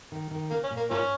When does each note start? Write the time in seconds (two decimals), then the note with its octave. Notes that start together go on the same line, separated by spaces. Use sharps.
0.12 D#3
0.31 D#3
0.51 C#3 A#3
0.64 C#4
0.71 A#2
0.77 A#3
0.90 G#2 F3 A#3 C#4